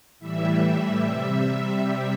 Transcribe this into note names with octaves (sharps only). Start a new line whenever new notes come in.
A2 E3 G3 E5
C3 G3